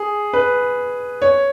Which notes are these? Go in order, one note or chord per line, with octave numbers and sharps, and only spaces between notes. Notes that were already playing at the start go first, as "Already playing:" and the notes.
Already playing: G#4
B4
C#5